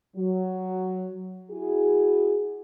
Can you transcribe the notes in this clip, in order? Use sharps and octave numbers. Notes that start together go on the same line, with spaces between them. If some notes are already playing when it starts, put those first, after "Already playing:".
F#3
E4 F#4 G#4